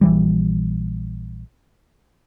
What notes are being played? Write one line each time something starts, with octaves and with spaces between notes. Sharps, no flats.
A#1 E3 G3